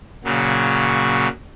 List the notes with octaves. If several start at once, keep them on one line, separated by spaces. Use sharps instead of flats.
A#2 C#3 F#3